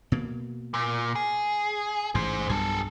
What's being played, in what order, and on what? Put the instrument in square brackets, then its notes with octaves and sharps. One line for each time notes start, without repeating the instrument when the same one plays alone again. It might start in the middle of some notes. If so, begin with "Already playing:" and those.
[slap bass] B2 A#3
[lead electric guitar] A#2
G#4
[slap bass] A1 G#2 [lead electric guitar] G#4 C5
[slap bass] B1 G2 B2 [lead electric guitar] G#4 A4